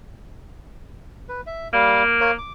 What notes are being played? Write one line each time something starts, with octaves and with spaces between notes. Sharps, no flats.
B4
E5
G3 A#3 F5
A#4 C#5 F5
D6